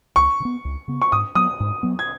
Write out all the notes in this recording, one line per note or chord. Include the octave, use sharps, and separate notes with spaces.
C#2 C#6
C#3
B3
C#2
C#3 B3
C#6
G#2 D#6
F#3 B3 D#6
G#2
F#3 B3
G#6